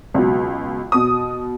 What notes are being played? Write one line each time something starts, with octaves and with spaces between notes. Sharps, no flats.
C#2 B2 F#3
B2 D#6